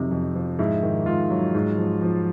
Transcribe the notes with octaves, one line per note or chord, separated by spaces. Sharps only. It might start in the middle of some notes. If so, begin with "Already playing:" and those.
Already playing: F2 C3 F#3 D#4
F2
F3
G#2 E4
D#3
G#2 F4
F#3
G#2
F3
F3